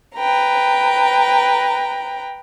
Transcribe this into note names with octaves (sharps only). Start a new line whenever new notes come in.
B4 G5 A#5